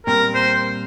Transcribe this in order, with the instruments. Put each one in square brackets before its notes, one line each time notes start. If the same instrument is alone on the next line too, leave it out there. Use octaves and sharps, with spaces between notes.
[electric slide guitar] A#2 G3 C4 [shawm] A#4
[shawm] C5